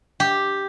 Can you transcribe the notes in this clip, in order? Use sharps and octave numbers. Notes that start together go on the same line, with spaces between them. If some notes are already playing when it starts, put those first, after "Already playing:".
G4